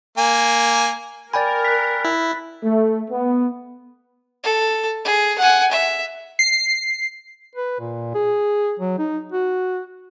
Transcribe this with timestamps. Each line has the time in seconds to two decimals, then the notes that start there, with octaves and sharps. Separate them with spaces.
0.18 A#3 G#5
1.33 A#4 D5 G5 G#5 B5 A6
1.65 F#6 B6
2.05 E4
2.63 A3
3.10 B3
4.44 A4
5.05 G#4
5.38 F#5 G#5
5.71 E5
6.39 C7
7.56 B4
7.80 A#2
8.14 G#4
8.80 F#3
8.98 D#4
9.32 F#4